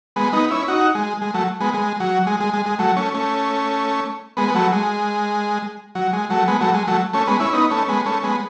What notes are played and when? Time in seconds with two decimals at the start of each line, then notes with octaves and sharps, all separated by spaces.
0.16 G#3 B3
0.33 B3 D#4
0.51 C#4 E4
0.68 D#4 F#4
0.95 G#3
1.22 G#3
1.34 F#3 A3
1.60 G#3 B3
1.74 G#3
2.00 F#3
2.27 G#3
2.40 G#3
2.54 G#3
2.66 G#3
2.79 F#3 A3
2.97 A3 C#4
3.14 A3 C#4
4.37 G#3 B3
4.48 B3
4.55 F#3 A3
4.72 G#3
5.95 F#3
6.13 G#3
6.30 F#3 A3
6.48 G#3 B3
6.61 F#3 A3
6.74 G#3
6.88 F#3 A3
7.13 A3 C#4
7.27 G#3 B3
7.40 C#4 E4
7.53 B3 D#4
7.70 A3 C#4
7.88 G#3 B3
8.06 A3 C#4
8.23 G#3 B3